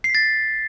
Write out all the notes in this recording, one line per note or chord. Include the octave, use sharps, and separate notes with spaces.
C7
B6
A6